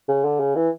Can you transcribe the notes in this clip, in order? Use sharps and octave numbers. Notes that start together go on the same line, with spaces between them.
C#3
D3
C#3
E3